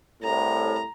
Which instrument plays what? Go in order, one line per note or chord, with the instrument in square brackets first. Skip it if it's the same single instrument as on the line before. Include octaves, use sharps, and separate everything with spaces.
[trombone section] C2 A2 [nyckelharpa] A#5